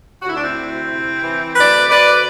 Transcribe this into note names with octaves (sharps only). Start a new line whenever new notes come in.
D2 F#4
E4
D4
C4 E4
D2
C3
E3
D2 B4 D5
D2 B4 D5